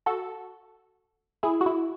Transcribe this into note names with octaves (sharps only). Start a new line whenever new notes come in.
F#4 A4
E4 G#4
F#4
E4